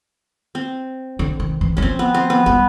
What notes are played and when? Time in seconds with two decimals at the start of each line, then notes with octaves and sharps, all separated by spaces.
0.55 C4
1.19 D3
1.40 D#3
1.61 E3
1.77 E3 C#4
1.82 F3 C4
1.99 B3
2.14 C4
2.30 B3
2.46 G3 B3